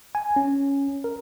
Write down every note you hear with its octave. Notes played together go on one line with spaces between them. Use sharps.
G#5
C#4
A#4